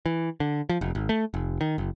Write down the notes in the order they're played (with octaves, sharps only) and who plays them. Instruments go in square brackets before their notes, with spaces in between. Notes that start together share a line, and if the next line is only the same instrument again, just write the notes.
[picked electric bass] E3
D3
F3
F1
G#1
A3
F1
D#3
F#1